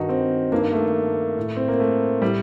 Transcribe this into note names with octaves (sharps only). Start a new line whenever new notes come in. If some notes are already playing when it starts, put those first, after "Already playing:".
Already playing: G2 D#3 D#4 F#4
C4
G2 D#3 A#3
A3
A2
C4
A#3
A3
A2 G3